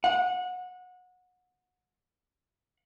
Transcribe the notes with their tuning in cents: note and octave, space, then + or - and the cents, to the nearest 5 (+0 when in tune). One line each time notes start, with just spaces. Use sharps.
F#5 -25